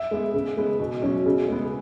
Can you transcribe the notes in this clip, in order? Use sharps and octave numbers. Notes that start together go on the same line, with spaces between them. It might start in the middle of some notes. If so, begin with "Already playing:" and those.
Already playing: E5
G#3 B3
C#3
G#3 B3
B2
F#3 C#4
C#3
G#3 B3